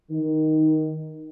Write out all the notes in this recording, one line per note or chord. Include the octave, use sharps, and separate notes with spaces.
D#3